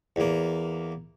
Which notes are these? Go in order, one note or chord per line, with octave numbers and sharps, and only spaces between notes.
E2 A#3